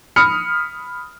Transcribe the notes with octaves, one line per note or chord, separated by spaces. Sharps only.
B5 D#6 F6 C#7